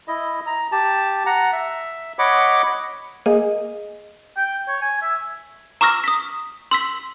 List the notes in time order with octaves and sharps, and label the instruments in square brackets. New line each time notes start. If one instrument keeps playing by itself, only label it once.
[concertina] E4 D#5
A#5
G4 A5
F#5 A#5
E5
C#5 D#5 F#5 B5 D6
[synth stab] A#3 G#4 [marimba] D#5
[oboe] G5
C#5
G#5
E5
[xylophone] A#5 C#6 D6 E6 F6 A#6
D#6 B6
C6 E6 B6